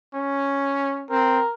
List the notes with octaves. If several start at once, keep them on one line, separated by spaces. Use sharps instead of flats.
C#4
C4 A#4